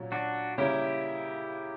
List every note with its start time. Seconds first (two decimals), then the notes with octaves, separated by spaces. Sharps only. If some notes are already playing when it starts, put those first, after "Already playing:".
Already playing: A#2 F#3 C#4
0.12 D4 F#4
0.58 C#3 G3 A#3 C#4 E4 G4